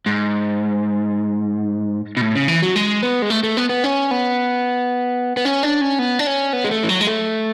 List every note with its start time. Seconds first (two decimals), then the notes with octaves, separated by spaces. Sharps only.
0.06 G#2
2.17 B2
2.21 A2
2.35 C#3
2.48 E3
2.63 F#3
2.76 G#3
3.02 B3
3.22 G#3
3.30 A3
3.43 A3
3.57 B3
3.69 B3
3.84 C#4
4.11 B3
5.37 B3
5.45 C#4
5.63 D4
5.81 C#4
5.99 B3
6.19 D4
6.27 C#4
6.53 B3
6.64 G#3
6.71 A3
6.83 E3
6.89 F#3
7.01 G#3
7.07 A3